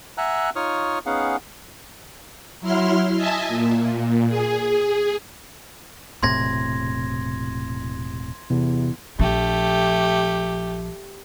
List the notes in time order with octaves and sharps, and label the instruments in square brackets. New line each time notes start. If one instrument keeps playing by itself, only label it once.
[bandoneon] E5 F#5 G#5 A#5 E6 F#6
D#4 F4 C#5 C#6 D#6 F6
B3 C#4 D#4 G#4 F5 F#5
[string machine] F#3 E4 C6 F6
D#5 E5 G#5 A5
A#2
G#4
[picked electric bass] E1 A2 C3 [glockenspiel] C6 G#6 A#6
[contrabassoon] E2 [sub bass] C3
[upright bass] A#1 F3 [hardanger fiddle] A3 G4